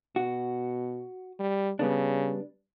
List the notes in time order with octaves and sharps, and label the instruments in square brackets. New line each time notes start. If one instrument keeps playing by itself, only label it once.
[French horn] B2 [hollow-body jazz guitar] F#4
[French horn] G3
[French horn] C#3 [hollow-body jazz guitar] G3 B3 D4